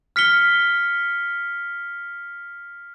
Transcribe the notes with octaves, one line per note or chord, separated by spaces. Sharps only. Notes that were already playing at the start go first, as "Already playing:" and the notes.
F6 B6 C#7 G7